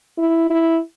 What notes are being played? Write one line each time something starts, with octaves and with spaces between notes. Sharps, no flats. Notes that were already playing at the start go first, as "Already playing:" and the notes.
E4
E4